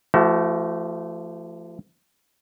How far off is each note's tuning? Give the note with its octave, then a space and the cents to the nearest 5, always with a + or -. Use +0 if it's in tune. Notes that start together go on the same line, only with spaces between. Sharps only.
F3 -35 A3 +0 F#4 +30